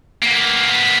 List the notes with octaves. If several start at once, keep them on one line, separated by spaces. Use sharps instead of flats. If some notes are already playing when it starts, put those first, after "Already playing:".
A#3 B3